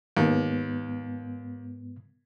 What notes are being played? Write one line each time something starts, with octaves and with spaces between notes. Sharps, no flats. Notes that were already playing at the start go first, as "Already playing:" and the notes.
D#2 G#2 B3